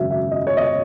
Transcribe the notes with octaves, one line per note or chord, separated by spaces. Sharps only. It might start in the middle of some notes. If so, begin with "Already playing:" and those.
Already playing: G#1 F#2 C#3 E5
E5
D#5
C#5
D#5
C#5